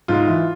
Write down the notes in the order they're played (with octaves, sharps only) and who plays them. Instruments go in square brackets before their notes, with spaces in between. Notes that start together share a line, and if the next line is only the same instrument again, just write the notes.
[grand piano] G#2 F4
E3